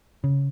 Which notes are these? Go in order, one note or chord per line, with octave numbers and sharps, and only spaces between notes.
C#3